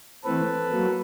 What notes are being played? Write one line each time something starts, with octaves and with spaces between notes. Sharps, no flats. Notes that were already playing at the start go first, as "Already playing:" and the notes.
E3 A3 C4 A4 B4
F#3 A#3